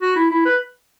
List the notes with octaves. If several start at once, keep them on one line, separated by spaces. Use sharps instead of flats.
F#4
E4
E4
B4